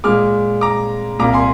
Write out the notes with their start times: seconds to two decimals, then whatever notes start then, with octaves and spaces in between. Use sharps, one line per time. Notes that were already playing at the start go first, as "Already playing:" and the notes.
0.04 A#2 G#3 D6 F6
0.61 A#5 D6
1.19 C2 A#2 G3 A#3 A#5 D6
1.33 G#5 C6